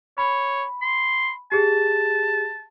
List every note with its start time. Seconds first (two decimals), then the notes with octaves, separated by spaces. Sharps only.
0.18 C#5 B5
0.82 C6
1.52 G4 G#4 A5